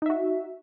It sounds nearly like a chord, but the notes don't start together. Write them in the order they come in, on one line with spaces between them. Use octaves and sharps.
D#4 E5 F#4